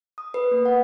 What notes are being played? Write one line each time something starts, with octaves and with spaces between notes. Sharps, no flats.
D#6
B4
A#3
F#5